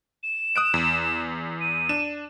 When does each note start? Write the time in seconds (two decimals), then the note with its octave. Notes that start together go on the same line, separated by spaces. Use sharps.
0.23 E7
0.56 D#6 F#6 D7
0.74 E2
1.60 D#7
1.89 D4 E7